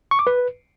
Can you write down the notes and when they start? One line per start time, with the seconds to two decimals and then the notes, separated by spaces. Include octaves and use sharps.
0.11 C#6
0.19 D6
0.27 B4